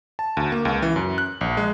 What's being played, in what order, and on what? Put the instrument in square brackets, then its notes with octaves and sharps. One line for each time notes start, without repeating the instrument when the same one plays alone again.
[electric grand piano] A5
D2
A#3
C#2
E3
F#2
F#6
A#1
G#3